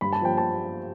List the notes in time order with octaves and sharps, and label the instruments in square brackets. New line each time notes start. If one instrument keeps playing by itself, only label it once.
[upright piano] G2 B5
A5
F3 G5
A5